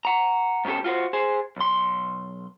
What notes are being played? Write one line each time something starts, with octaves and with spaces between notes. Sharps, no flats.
F#5 A#5
G#2 B2 C#4 G4 A4
F4 F#4 B4 C5
G#4 C5
B1 C6